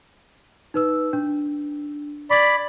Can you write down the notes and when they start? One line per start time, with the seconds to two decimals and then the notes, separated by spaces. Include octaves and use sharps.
0.74 D#4 B4 E6
1.13 D4
2.30 D5 B5 C#6 G#6